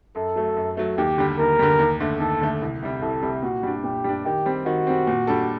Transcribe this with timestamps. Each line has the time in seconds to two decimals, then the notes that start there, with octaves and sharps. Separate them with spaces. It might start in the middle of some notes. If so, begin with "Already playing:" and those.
0.15 F#2 A4
0.36 F#3 A3
0.57 F#2
0.77 F#3 A3
0.98 D#2 G4
1.18 D3 G3
1.39 D#2 A#4
1.59 D3 G3
1.79 D#2
2.00 D3 A3
2.20 D#2 A4
2.41 D3 A3
2.62 C2
2.82 C3 G3
3.02 C2 A4
3.23 C3 G3
3.43 A#2 F#4
3.63 G3 D4
3.84 A#2 G4
4.04 G3 D4
4.25 D#3 G4
4.46 G3 C4
4.66 D#3 F#4
4.87 G3 C4
5.07 A#2
5.27 G3 D4 A4